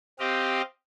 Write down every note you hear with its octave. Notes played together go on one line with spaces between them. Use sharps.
C4 G4 D#5 F5